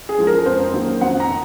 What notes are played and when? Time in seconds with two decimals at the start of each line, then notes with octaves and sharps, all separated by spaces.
0.09 G#4
0.18 F3 G#3
0.27 A#4
0.46 F2 C5
0.74 D#3 F#3 A#3
1.01 F2 F#5
1.20 A#5
1.29 D#3